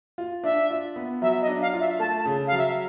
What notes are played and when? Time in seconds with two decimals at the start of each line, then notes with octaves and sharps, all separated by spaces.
0.18 F4
0.44 D4 E5
0.70 F4
0.96 B3
1.22 F#3 E5
1.41 D#5
1.48 D4
1.61 F5
1.73 F4
1.80 E5
1.99 A3 A5
2.19 A5
2.26 C#3
2.47 F#3 F5
2.58 E5